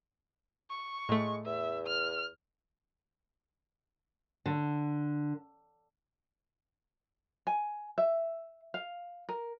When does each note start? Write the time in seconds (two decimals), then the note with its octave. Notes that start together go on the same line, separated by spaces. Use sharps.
0.70 C#6
1.09 A2 G#3 A3
1.46 E2 E5
1.87 F6
4.46 D3
7.47 G#5
7.98 E5
8.74 F5
9.29 A#4